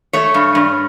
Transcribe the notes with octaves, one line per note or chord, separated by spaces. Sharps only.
A3 C#5
G2
G2